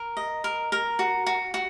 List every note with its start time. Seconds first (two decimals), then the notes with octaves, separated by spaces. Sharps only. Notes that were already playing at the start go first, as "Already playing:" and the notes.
Already playing: A#4
0.17 D#5
0.44 A#4
0.72 A#4
0.99 F#4
1.27 F#4
1.54 F#4